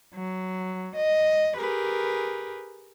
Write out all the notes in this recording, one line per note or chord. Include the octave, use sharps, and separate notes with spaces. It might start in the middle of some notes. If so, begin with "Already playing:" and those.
F#3
D#5
G4 G#4 A#4 B4